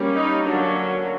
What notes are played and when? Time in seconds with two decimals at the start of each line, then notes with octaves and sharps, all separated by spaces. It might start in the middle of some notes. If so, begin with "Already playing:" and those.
Already playing: G3 A#3 C#4
0.15 D#4
0.45 D3 F#3 A#3 C#4 D4